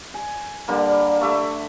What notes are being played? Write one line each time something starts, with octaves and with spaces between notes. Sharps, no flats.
G#5
D3 G3 A#3
A3 E5 D6